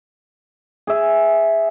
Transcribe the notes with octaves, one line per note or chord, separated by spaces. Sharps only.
G#4 E5